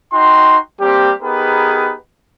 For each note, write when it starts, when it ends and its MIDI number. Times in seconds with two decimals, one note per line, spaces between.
0.13 0.57 63
0.13 0.57 66
0.13 0.57 79
0.13 0.57 84
0.81 1.12 55
0.81 1.12 58
0.81 1.12 60
0.81 1.12 67
1.22 1.94 59
1.22 1.94 63
1.22 1.94 67
1.22 1.94 68
1.22 1.94 70
1.22 1.94 71